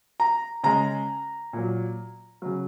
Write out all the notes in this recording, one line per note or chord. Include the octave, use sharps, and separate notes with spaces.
A#5
C#3 G#3 A#5
A#2 F#3
C#3 F#3